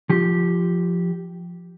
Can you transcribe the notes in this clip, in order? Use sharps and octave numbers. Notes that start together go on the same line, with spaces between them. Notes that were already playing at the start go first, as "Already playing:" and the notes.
F3 G4